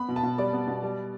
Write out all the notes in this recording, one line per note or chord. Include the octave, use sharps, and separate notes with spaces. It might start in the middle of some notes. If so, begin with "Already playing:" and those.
Already playing: B3 B5
B2
A5
B2
G3 D5
B3
B2
G3